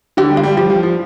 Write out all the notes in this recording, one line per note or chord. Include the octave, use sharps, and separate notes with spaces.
D3 G4
G3
F4
G3
F3 G4
F3
F3